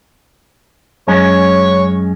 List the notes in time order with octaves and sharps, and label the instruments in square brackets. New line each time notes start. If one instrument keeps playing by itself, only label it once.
[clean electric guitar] F#2 G#3 C#4 [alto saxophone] C#5